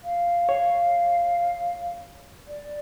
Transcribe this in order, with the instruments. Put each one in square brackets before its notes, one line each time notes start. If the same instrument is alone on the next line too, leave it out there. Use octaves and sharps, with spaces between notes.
[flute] F5
[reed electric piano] C#5
[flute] D5